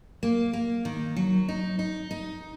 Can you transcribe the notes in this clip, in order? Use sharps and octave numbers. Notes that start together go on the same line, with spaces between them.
A#3
A#3
D#3
F#3
D#4
D#4
D#4